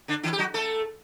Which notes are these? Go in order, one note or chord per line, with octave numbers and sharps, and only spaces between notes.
D3 D4
E3 E4
G4
F#3 F#4
A3 A4